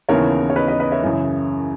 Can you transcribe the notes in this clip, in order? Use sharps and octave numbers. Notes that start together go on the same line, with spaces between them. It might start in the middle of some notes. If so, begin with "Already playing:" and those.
D#2 C#3 E3 B3 A#4 C#5
C#5
B4 D#5
B4 D#5
B4 D#5
C#5 E5
F#2 C#3 E3